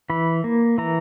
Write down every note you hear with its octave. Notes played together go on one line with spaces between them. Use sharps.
E3 B5
A#3
E3 A#5